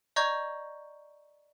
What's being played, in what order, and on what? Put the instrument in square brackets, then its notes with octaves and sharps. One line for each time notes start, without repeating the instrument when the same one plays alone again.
[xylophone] D5 D#5 A#5 C#6 G6 G#6